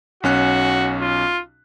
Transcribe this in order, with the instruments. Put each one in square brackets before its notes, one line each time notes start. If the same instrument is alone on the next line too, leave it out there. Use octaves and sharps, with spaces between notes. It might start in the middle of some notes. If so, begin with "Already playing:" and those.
[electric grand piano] B1 C#4 F#6 [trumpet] F#4
[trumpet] F4